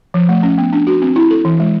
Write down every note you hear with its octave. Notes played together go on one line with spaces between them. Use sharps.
F3
A3
C#4
B3
D4
F#4
C4
E4
A4
E3
G#3